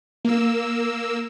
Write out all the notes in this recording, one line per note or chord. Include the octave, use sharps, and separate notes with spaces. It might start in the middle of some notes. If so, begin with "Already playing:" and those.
A#3 E6